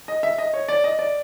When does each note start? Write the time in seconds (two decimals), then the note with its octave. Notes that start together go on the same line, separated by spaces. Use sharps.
0.08 D#5
0.23 E5
0.38 D#5
0.53 C#5
0.69 D5
0.84 D#5
0.99 D5